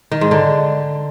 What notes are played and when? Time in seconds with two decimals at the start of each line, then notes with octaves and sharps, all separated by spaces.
0.11 D#3
0.21 G#2
0.31 D3